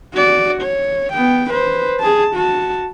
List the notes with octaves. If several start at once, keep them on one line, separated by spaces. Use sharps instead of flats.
F#4 D5
C#5
B3 G5
B4 C5
G#4 A5
F#4 A5